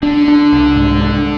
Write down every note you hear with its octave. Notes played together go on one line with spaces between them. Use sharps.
D3 D4
D4
C2
G#2
D4